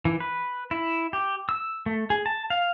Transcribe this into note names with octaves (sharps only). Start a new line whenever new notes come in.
E3
B4
E4
G4
E6
A3
G#4
A5
F5